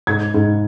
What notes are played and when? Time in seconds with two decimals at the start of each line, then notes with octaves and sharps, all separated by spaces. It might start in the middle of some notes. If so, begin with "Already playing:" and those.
0.07 G#2 G#6
0.34 G#2